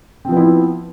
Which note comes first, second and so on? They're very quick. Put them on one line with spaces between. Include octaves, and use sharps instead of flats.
C4 F3 B3 E4